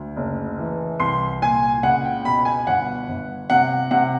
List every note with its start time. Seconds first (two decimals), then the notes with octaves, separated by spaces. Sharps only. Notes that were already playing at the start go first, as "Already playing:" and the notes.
Already playing: D2
0.16 F#1
0.59 E3
1.00 C2 C6
1.42 A#2 G#5
1.83 C#2 F#5
2.05 G5
2.25 B2 B5
2.45 G#5
2.67 G1 F#5
3.09 G1
3.50 C3 F#5
3.91 C3 F#5